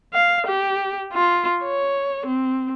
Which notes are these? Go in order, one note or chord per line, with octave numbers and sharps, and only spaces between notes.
F5
G4
F4
C#5
C4